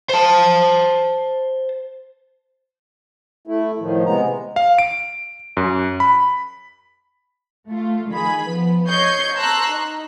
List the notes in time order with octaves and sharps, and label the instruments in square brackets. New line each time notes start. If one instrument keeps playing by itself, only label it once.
[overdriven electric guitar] C5 A5
[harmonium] A3 E4
A2 D#3 F3
C3 G#3 B3 A#5
[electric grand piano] F5
D7
F#2
B5
[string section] A3 F4
D#3 G#4 B5
F3 B3
C#5 D#5 C#6 G6 G#6 C7
A5 A#5 C6 C#6 E6 F#6
D#4